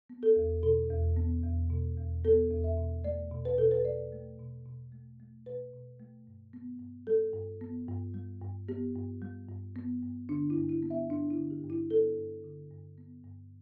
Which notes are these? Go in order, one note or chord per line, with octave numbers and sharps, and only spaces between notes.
B3
A4
E2
B2 A4
E2
B3
E2
B2
E2
B3 A4
E2
E5
B2
A3 D5
B2
B4
B2 A4
B4
A3 D5
A3
B2
B2
A3
A3
B2 B4
B2
A3
G2
B3
G2
G3 A4
G2
B3
G2
G3
G2
B3 G4
G2
G3
G2
B3
G2
D3 D4
E4
G2
E4
B3
E5
G2 D4
E4
D3
G4
G2
E4
B3 A4
G2
D3
G2
B3
G2